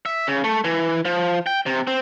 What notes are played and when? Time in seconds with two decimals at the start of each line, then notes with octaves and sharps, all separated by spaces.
0.06 E5
0.27 C#3
0.44 A3
0.64 E3
1.05 F3
1.46 G5
1.66 C3
1.87 C4